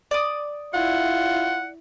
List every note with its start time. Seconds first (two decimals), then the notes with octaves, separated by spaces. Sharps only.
0.11 D5 D#6
0.74 E4 F4 F#5